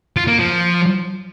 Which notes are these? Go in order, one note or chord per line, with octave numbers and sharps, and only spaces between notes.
F4
A#3
F3